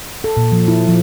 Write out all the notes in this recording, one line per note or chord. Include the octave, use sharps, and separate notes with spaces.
A4
A#2
F3
E4
F3